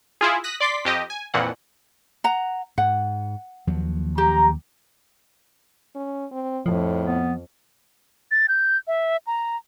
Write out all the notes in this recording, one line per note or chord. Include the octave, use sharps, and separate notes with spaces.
E4 F4 G#4
D#6 F#6 A#6 B6
D5 C6 D6 B6
F2 G4 D#5
G#5
F2 A#2 E3 F#5
F#5 A#5
G#2 F#5
D#2 F3 F#3
G4 A#5
C#4
C4
F2 A2 F3
B3
A6
G6
E5
A#5